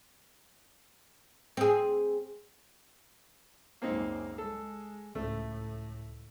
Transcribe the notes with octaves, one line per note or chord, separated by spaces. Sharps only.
C4 G#4
C#2 F#2 A#3 C4 D#4
G#3 A4
C#2 A2 A3